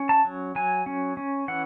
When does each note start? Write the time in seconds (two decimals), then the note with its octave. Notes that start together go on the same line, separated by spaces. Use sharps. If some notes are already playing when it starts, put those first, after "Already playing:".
Already playing: C#4
0.09 A5
0.25 F#3
0.55 F#3 G#5
0.86 C#4
1.17 C#4
1.48 E3 F#5